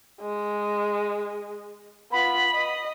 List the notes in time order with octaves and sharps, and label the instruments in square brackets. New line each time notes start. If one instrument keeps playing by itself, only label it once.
[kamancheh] G#3
[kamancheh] B3 F4 [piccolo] B5
[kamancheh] D#5